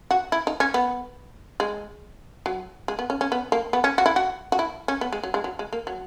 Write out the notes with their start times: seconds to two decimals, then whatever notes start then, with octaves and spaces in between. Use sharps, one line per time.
0.11 F#4
0.32 E4
0.47 D#4
0.60 C#4
0.74 B3
1.60 G#3
2.46 F#3
2.88 G#3
2.99 B3
3.10 C#4
3.21 C#4
3.32 B3
3.52 A#3
3.73 B3
3.84 C#4
3.98 F#4
4.06 E4
4.16 F#4
4.52 F#4
4.59 E4
4.88 C#4
5.01 B3
5.13 G#3
5.23 F#3
5.34 G#3
5.44 F#3
5.59 G#3
5.73 A#3
5.87 F#3